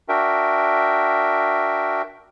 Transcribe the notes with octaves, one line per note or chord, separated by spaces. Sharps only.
D4 F#4 A#4 E5 G5